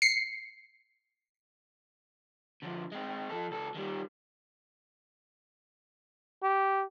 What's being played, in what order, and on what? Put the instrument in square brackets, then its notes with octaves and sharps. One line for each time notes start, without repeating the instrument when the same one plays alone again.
[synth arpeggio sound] C7 C#7
[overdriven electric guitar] D3 F3
G#3 C4
F3 A4
C#2 A4
D#3 G3
[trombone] G4